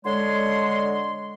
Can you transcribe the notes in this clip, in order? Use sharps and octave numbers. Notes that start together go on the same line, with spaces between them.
D3 G#3 C#5 C6